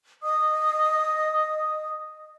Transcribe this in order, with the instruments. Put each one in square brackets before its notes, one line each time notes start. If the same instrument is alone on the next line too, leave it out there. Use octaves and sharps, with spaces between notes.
[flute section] D#5 D#6